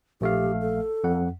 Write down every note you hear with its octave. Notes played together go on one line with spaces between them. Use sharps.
A#1 A3 G4 F5
A4
F2 F#5